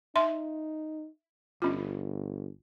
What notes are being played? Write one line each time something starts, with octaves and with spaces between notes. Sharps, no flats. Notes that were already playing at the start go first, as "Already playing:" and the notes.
D#4 E5 C6
G1 C#4 F4